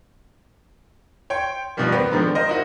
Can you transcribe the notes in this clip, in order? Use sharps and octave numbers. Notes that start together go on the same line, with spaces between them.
C#5 G5 C6
F2 B2 D#3 F3 G3 A#3
B3 C4
G#2 D3 D#3 F3
A#4 C5 D#5
D#4 E4 F#4